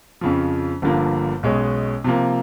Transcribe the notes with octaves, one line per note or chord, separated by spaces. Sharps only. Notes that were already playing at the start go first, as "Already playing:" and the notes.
F2 C#3 F3
G1 G2 D3 F3 A#3
B1 B2 G#3 C#4
C3 F3 A#3